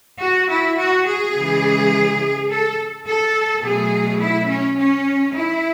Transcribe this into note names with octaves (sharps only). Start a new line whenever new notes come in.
F#4
E4
F#4
G#4
C#3 E3 G#3
A4
A4
B2 F#3 A3 G#4
E4
C#4
C#4
E4